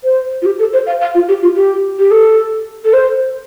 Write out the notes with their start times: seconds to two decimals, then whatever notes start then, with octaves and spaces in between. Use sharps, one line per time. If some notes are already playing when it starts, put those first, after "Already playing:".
0.04 C5
0.42 F4
0.45 G4
0.59 A4
0.73 C5
0.86 F5
1.01 F5
1.14 F4
1.28 G4
1.42 F4
1.55 G4
1.99 G4
2.11 A4
2.84 A4
2.93 C5